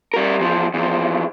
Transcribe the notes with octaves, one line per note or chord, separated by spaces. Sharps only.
G3 A#4
E2 F3
E2 F3